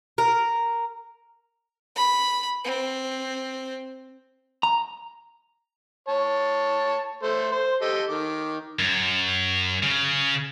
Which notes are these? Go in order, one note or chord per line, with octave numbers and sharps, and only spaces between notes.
A#4
B5
C4
A#5
C#5 A5
A3 A4 C5
C5
G4 A4 D#5
D#3 D6
F#2
C#3